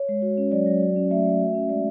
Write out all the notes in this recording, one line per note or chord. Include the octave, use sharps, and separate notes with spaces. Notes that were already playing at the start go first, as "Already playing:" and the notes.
Already playing: C#5
G#3
F#4
C#4
F#3 D5
F#3
F#4
C#4
A3 E5
A3
F#4
C#4
G#3 D5